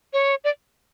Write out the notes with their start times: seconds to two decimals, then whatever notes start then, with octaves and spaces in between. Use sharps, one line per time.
0.13 C#5
0.44 D5